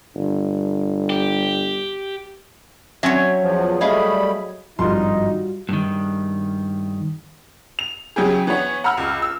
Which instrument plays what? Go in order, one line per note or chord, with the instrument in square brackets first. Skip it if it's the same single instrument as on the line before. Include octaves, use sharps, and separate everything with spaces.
[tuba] G1
[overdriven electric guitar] G4
[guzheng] F#3 C#5 [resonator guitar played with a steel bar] C4 C#4 E5
[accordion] E2 F3
[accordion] G3 A3 B5 [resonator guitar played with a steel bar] G#4 D#5 F5
[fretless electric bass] G#1 G2 F3 [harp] G3 F4 F#4 [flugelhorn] D#4 [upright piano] C6
[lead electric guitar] G2 D#3
[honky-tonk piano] F7
C#3 F#3 E4 G4 G#4
E3 B3 C#5
F#5 A#5 B5 E6 F6
C#2
E6